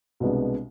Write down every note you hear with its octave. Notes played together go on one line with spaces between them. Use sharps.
C2 B2 G#3 B3 D4